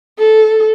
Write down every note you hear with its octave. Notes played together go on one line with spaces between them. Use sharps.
A4